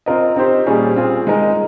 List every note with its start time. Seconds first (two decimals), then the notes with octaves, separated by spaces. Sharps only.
0.06 C4 F4 A#4 D#5
0.36 C4 D#4 G4 C5
0.66 A#2 G3 C#4 G#4
0.96 C4 F4 G#4
1.27 G#3 D#4 A#4 D#5